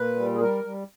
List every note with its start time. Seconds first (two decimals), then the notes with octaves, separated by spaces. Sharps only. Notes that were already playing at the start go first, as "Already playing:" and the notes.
Already playing: A#2 B4
0.16 G3
0.35 G#4
0.40 G3 A#4
0.64 G3